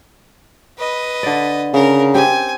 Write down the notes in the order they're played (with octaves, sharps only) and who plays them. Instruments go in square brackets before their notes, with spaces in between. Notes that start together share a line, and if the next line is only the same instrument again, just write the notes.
[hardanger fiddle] B4 D#5
[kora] D3 D5
[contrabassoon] C#3 [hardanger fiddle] A#4
[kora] C4 G4 [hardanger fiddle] G#5